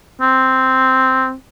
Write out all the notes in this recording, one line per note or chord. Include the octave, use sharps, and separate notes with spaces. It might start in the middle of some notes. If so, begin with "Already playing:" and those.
C4